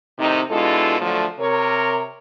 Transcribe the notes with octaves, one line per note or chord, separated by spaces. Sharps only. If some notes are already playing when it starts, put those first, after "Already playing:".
A2 C3 D#3 C4 D#4
B2 G#3 D4 E4 F4 A4
D3 F3 F#3 A3
C3 A#4 C#5